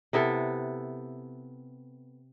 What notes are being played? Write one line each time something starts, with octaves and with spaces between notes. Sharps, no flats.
C3 B3 E4 A4